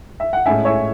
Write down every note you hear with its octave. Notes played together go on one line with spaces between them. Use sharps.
E5
F#5
A2 G#3 C#4 E4 E5 G#5
C#5 E5